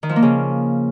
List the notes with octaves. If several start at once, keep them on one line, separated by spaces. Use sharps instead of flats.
D#3
F3
A#3
C#3